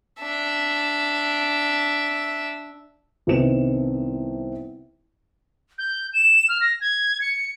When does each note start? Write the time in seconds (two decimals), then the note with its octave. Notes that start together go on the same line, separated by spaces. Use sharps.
0.21 D4 E5
3.27 C2 C3 D#3 B3 E7
5.78 G6
6.14 E7
6.49 F6
6.61 A#6
6.81 G#6
7.22 C#7